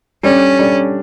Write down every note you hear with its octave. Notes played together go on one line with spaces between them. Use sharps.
G3 C#4 D4 A4 D5
G3 D4 A4 D5